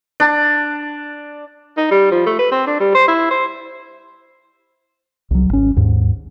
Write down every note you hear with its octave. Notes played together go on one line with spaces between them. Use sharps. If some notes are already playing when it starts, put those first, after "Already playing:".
D4
D#4
G3
F3
A3
B4
C4
D4
G3
C5
E4
C5
C2 F#3
G#1 C#4
D#2 G#2